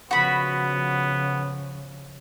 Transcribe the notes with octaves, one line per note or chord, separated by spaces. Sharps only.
C#3 F3 B3 F#4 B5